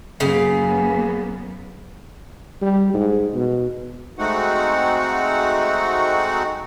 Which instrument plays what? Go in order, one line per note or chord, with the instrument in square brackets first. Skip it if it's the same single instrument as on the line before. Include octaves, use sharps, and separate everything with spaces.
[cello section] F#2 A#3 B3 [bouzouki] C#3 F5
[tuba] G3
G#2
B2
[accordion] G#3 A3 C4 D#4 F#4 F#5